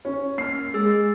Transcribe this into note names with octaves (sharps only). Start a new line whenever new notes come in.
C#4
A#3 F6 C7
G#3 G#4 E6 A6